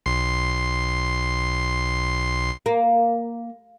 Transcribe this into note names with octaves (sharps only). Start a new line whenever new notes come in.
B1 C6 C7
A#3